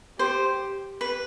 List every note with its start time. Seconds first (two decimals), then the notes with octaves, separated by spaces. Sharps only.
0.19 G4 C5
1.01 B4